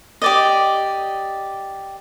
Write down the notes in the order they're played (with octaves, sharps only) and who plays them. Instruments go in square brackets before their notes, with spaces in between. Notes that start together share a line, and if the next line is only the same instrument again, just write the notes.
[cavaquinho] G4 D5 D#5